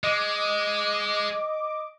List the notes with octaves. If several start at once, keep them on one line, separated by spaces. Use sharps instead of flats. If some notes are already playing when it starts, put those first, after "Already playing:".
G#3 D#5 D6